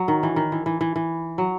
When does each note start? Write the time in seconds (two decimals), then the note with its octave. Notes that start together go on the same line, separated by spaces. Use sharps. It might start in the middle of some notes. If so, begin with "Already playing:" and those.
Already playing: F#3
0.08 D#3
0.23 E3
0.36 D#3
0.52 E3
0.66 E3
0.81 E3
0.96 E3
1.38 F#3